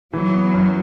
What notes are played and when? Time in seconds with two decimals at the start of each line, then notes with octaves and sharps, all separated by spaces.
0.13 E3 F#3
0.34 B3
0.54 F#2